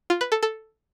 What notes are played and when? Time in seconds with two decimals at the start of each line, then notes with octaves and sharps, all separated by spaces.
0.10 F4
0.21 B4
0.32 A4
0.43 A4